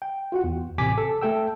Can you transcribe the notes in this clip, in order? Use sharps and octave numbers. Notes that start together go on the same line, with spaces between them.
G5
F4 F#4 F#5
E2
A1 C3 G#5 D6 B6
A4
A3 A4 G5 E6